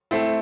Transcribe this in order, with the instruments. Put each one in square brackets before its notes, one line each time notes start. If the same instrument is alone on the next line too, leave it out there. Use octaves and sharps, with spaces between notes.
[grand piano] A3 C4 E4